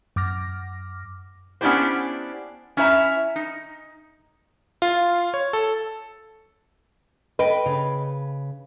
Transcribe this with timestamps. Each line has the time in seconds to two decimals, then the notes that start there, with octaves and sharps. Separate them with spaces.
0.16 F#2 D6 F6 A#6
1.61 B3 C#4 D4 E4 G4 C5
2.77 C#4 E4 C5 E5 A#5
3.36 D#4
4.82 F4
5.34 C#5
5.53 A4
7.39 B4 D#5 G5
7.66 C#3